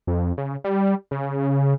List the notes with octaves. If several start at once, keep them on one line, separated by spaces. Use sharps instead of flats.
F2
C#3
G3
C#3